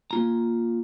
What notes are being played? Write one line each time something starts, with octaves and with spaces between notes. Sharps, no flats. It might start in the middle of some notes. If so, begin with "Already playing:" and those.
A#3 F4 A#5